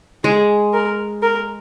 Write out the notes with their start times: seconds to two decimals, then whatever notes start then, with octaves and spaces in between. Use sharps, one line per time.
0.24 G#3 G#4
0.73 A#4
1.22 A#4